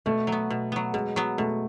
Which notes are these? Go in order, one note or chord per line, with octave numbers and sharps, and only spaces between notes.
B2 A3
F#3
B3
B2
F#3 B3
B2 G#3
F#3 B3
B2 A3